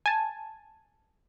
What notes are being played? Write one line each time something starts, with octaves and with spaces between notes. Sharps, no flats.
G#5 A5